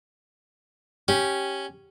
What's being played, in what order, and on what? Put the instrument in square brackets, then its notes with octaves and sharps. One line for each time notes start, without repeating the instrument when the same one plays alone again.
[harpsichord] C#4 [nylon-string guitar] G4